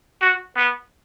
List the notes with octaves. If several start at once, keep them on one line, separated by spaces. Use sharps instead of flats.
F#4
B3